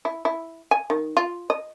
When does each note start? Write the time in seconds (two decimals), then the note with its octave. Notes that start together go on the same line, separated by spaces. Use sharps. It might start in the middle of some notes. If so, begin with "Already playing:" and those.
0.05 E4
0.25 E4
0.71 G#5
0.90 D#3
1.17 F4
1.50 D#5